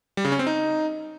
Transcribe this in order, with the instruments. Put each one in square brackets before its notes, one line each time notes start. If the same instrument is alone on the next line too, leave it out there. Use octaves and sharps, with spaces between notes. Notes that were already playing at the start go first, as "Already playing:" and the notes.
[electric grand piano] G3
C#3
C#4
C4
D#4